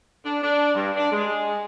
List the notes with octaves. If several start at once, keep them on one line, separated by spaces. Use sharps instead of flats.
D4
D4
G2
D4
G#3